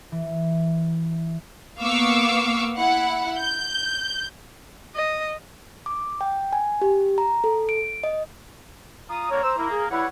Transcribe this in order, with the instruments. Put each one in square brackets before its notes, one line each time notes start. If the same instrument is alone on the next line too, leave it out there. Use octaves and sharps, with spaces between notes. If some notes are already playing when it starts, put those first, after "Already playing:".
[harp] E3
[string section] A#3 B3 F5 C#6 D6 E6
E4 F#5
G6
[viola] D#5
[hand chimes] D6
G5
G#5
G4
A#5
A4
D7
D#5
[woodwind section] F4 D#6 [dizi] A#5
[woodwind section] D3 A#3 [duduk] C#5
[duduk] C5 [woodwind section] D6 E6
[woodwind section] A#3 [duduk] E4
[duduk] G#4
[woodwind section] G3 B4 C#5 [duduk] E4 [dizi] F#5